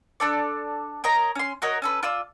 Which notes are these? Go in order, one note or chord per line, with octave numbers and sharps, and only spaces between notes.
D4 A4 D5
A#4 C#5 D#5 A#5
C#4 C6
F#4 A#4 C#5 D#5
C#4 A4 B4
F4 D5 E6